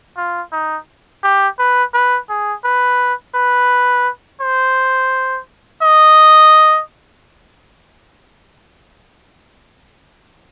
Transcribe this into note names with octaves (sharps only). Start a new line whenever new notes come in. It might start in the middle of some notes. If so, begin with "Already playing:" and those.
F4
D#4
G4
B4
B4
G#4
B4
B4
C5
D#5